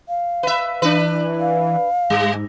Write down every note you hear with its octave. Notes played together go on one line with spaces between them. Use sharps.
F5
B4 E5
E3 D4 B4
F5
G#2 G3